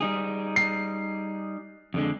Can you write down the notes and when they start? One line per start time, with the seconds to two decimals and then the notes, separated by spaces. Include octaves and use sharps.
0.01 G3 D#4 G#4
0.56 C7
1.94 F2 D3 G#3